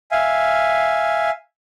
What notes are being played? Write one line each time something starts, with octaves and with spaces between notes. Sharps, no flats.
E5 F5 G#5